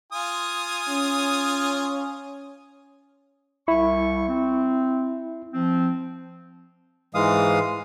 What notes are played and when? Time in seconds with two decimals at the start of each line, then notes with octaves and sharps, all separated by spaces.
0.12 F4 G#5 D#6
0.89 C#4
3.68 C2 E4 C#6
4.28 C4
5.54 F3 C4
7.15 G#2 E3 G#3 F5 D#6